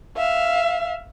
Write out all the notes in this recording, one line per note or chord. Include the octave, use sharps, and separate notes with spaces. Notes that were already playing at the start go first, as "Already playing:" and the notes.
E5 F5